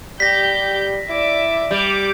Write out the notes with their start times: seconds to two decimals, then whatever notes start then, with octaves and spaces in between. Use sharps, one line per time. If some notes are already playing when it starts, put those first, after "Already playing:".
0.20 G3 G4 G6 A#6 B6
1.09 E4 D5 E5 D6
1.71 G3 D6